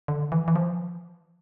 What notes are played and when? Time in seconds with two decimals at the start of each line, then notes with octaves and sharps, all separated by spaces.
0.08 D3
0.32 E3
0.48 E3
0.56 F3